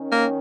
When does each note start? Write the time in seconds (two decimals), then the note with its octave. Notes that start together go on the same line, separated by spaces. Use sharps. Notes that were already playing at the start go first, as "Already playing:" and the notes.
Already playing: D#3 C#4
0.12 A#3